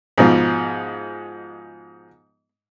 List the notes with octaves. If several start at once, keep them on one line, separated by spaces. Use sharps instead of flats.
G#2 B2 F3